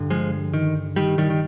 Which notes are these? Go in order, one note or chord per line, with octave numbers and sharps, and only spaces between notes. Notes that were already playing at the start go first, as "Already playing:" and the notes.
Already playing: G2 D3
F3 G#3
D#3
D#3 G3
D#3 G3
D#3